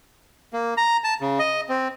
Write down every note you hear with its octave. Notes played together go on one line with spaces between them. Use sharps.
A#3
A#5
A5
C#3
D#5
C4